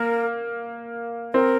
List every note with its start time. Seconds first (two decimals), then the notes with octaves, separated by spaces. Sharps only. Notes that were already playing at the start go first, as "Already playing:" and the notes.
Already playing: A#3 A#4
1.34 C4 A#4